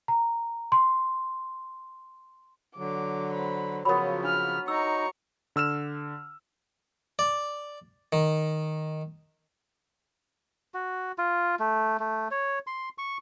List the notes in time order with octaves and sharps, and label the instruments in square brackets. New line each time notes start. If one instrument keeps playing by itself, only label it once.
[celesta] A#5
C6
[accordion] D3 F#3 [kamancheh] D6
[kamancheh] C5 B5
[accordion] C#3 F3 [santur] F#3 B3 [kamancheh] F4 C#5 [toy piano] A#4 B5
[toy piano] D4 [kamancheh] B5 F6
[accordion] D#4 [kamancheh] A#5 C#6 [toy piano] E6
[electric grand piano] D3 E6 F6 E7
[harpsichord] D5
D#3
[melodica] F#4
F4
A3
A3
C#5
C6
C#6